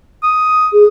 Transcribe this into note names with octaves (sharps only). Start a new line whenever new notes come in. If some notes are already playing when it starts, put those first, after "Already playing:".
D#6
G#4